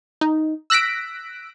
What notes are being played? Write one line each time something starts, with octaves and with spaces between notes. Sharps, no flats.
D#4
E6 F#6 A#6 B6 D7